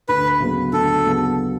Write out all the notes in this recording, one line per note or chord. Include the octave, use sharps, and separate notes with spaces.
D2 B4
C#3 F#3 B3
D2 A4
C#3 F#3 B3